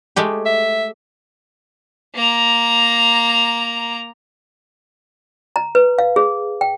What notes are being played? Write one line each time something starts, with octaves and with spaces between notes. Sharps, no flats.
G#3 A3 G4
E5
A#3 A#5
A#5
B4
F5
G#4
G5